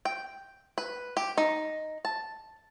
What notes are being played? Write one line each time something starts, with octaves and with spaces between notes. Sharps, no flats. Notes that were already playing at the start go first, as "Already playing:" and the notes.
G5
B4
G4
D#4
A5